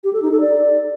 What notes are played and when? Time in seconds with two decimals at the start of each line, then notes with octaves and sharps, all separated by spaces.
0.04 G4
0.13 A4
0.22 D#4
0.32 A4
0.41 D5